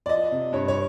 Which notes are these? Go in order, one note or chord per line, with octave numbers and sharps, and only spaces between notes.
D5
F3 D#5
C3
G2 C#5
C#5